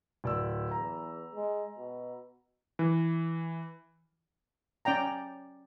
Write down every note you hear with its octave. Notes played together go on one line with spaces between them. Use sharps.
D1 D5 E6
E2 A#5
G#3
B2
E3
C#4 D5 G5 A#5